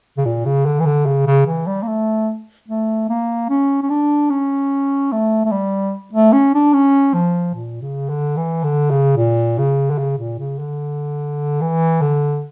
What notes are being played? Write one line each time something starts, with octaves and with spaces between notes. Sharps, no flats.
C#3
A#2
C#3
D3
E3
D3
C#3
C#3
E3
G3
A#3
A3
A3
A#3
C#4
C#4
D4
C#4
A3
A3
G3
A3
C#4
D4
C#4
F3
A#2
C#3
D3
E3
D3
C#3
A#2
C#3
D3
C#3
A#2
C#3
D3
E3
D3